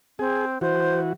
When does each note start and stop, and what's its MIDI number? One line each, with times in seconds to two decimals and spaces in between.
0.19 0.58 60
0.19 0.45 68
0.61 1.13 52
0.61 1.13 66
0.61 0.99 72